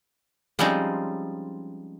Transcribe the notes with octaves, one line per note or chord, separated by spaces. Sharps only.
F3 G3 G#3 C4 C#4 D#4